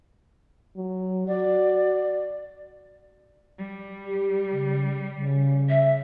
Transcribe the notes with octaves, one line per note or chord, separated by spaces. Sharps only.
F#3
F#4 D5
G3
G4
C#3
C#3
E5